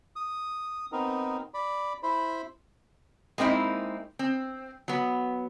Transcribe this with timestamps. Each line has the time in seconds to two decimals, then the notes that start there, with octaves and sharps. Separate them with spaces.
0.16 D#6
0.92 B3 C4 D#4 A#4
1.54 D5 B5
2.03 E4 C5 B5
3.38 G#3 A#3 C4 D#4 E4
4.19 C4
4.88 F#3 B3